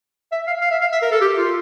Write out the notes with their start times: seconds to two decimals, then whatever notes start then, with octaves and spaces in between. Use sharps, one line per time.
0.32 E5
0.47 F5
0.61 F5
0.71 E5
0.81 F5
0.92 E5
1.02 A#4
1.12 A4
1.21 G4
1.37 F4